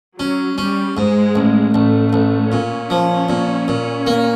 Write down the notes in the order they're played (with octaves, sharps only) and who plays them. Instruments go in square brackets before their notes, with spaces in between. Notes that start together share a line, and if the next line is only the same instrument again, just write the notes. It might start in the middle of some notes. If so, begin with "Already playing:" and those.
[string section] F#3 [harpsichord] C#4
[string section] G3 [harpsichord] C#4
[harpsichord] G#2 [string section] G#3
[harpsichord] A1
[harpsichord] A1 [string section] A3
[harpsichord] A1
[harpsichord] A#2 [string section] C#4
[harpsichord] F3
A#2
A#2
A#3